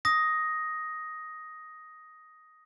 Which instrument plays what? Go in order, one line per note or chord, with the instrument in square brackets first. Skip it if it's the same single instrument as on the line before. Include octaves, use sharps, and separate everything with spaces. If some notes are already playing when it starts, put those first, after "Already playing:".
[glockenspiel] D#6 A#6